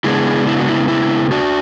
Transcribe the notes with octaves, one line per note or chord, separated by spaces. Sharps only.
C#3 G#3 B3 D4 E4 G#4
E4
F#4
E4
E4
D4 F#4